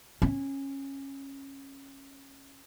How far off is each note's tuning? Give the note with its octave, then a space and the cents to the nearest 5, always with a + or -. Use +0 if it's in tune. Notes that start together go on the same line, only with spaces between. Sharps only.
C#4 -15